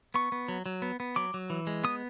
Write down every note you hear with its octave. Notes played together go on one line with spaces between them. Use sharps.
B3 C#6
B3
F#3
F#3
B3
B3
F#3 D6
F#3
E3
G#3
B3 D#6